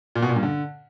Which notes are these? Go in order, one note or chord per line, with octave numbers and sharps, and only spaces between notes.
A#2
B2
A#2
G2
D3